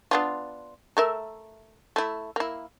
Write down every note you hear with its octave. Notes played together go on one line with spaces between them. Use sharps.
B3 D4 F4
A3 A#4 E5
A3 E4
A#3 E4